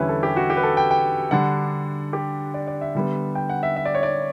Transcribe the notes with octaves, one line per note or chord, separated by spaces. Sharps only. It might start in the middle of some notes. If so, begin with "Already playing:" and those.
Already playing: E2 D3 G3 C#4 E4 B4 C#5
A4
G4
F#4
G4
B4
A4
G5
G5
D3 G3 D4 F#5
G4
D5
D5
E5
D3 G3 B3
G5
F#5
E5
E5
D5
C#5
D5